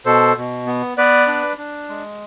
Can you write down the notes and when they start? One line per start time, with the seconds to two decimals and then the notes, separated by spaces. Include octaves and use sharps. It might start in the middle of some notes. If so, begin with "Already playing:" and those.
0.05 B2 A4 C5
0.37 B2
0.67 B3
0.98 B3 B4 D5
1.27 D4
1.58 D4
1.89 G#3